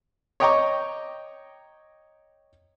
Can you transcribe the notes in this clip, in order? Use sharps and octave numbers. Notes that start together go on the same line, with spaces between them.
C#5 D#5 G5 A#5 C#6 D6